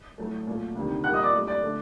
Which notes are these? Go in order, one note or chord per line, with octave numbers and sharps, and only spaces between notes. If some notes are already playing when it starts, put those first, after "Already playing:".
A2 F#3 A3
A#2 F#3 A3
D2 C3 D#3
A#2 G3 A#3 F#5 F#6
D#5 D#6
D5 D6
G2 F#3 A3
D5 D6
D3 A3